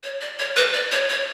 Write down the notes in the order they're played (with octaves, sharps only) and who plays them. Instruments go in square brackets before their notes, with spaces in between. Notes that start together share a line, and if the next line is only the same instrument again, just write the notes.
[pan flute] C#5
D5
C#5
B4
D5
C#5
C#5